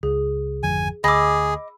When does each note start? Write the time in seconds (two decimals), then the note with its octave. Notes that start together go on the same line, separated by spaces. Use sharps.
0.03 C#2 G#4
0.63 G#1 F2 D3 G#5
1.04 D2 G#4 D#5 B5 D6 E6